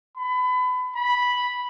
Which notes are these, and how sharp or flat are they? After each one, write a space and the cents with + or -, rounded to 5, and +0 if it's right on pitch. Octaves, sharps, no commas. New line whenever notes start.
B5 +30
B5 -5